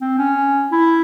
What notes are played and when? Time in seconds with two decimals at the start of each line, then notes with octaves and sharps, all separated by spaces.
0.01 C4
0.19 C#4
0.72 E4